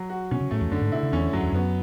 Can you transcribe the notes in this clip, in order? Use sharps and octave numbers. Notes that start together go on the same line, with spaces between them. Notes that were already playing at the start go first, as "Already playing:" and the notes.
Already playing: F#3
F#4
B2 C#4
C#3
A2 A3
E2
F#2 D3
G#2
B2 E4
C#3
E2 C#4
F#2 F#3
E2
F#2 B3